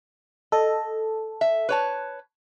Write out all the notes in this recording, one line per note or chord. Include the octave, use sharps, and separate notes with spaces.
A4 D#5
E5
B4 C#5 A5